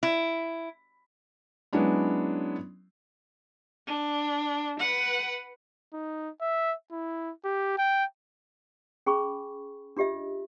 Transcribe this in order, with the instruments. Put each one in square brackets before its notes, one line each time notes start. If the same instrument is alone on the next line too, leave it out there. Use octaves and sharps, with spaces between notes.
[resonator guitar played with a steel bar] E4
[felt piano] F#3 G#3 B3 C#4 D4 E4
[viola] D4
B4 F#5
[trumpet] D#4
E5
E4
G4
G5
[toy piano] C#4 G#4 G#5 B5 C#6
D4 F4 G4 D#5 E5